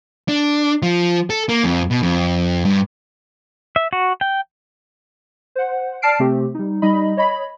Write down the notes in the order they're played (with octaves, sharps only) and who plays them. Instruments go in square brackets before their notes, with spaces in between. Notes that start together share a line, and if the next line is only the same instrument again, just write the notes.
[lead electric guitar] D4
F3
A4
A#3
F2
B2
F2
G2
[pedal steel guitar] E5
F#4
G5
[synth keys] C5 F#5
D5 A5 F6 C7 D7
C3 A3 C4 G4
G3 D#4
G3 D#4 D#5 B5
C#5 D#5 B5